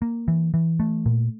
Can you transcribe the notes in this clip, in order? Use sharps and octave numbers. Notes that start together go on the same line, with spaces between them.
A#3
E3
E3
A3
A#2